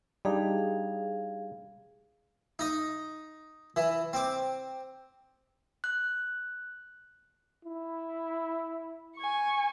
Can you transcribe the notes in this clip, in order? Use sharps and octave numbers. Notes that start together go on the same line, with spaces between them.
G3 D4 D#4 G#4 F5
D#4 D#5
E3
C4 D6
F#6
E4
G#5 C#6